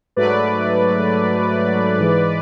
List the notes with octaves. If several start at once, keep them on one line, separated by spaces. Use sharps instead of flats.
G#2 F#3 A3 B4 D5
G#2 E3 G#3